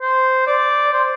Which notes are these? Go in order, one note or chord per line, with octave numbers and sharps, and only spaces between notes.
C5
D5
C5